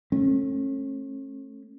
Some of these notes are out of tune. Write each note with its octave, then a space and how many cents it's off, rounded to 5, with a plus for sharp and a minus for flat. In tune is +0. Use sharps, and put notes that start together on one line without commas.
A3 +0 C#4 -35